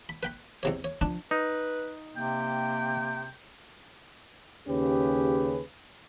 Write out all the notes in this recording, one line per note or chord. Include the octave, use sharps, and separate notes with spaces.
B5
B4 G5 B5
E2 C3 C#5
C#5
F3 D4
D#4 B4
C3 A#3 G5
D#2 C#3 C#4 G4 G#4 B4